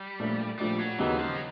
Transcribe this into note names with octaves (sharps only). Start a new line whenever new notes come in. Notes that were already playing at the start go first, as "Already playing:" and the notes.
Already playing: G3
A#2 F3 A3 D4
A#2 F3 G3 A3 D4
F#3
D#2 C#3 E3 F#3 B3 D#4
F3
F#3